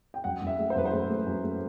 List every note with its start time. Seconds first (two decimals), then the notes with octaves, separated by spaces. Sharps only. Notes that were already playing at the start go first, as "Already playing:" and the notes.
0.14 G5
0.24 F#2 F#5
0.42 F#2
0.47 E5
0.59 A3
0.70 C5
0.76 F#2 B4
0.85 C5
0.93 A3
1.10 A3
1.27 F#2
1.44 A3